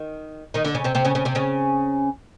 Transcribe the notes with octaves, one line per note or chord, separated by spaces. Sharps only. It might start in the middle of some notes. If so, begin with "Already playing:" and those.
Already playing: D#3
D#3 D#4
D3 D4
C#3 C#4
C3 C4
C3 C4
C#3 C#4
C#3 C#4
C3 C4
C#3 C#4